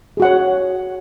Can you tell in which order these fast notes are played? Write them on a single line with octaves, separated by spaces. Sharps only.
G#4 F#4 F#5 C#5